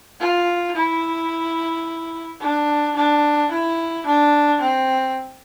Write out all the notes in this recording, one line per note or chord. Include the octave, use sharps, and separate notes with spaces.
F4
E4
D4
D4
E4
D4
C4